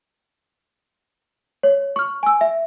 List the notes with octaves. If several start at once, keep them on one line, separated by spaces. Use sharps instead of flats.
C#5
C#6 F6
G#5 E6
E5